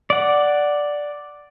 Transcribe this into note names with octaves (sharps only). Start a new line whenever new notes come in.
D5 F#5